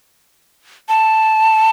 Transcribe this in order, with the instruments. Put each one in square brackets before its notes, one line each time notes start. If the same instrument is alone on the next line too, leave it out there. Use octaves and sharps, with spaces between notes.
[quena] A5